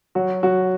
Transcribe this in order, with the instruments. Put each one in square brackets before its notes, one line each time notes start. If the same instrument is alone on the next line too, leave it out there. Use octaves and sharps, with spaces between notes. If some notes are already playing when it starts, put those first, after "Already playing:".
[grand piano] F#3 [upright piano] F#4
[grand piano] F#3 [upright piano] F#4